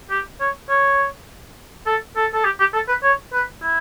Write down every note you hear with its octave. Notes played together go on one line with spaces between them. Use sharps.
G4
C#5
C#5
A4
A4
A4
G4
G4
A4
B4
C#5
B4
E4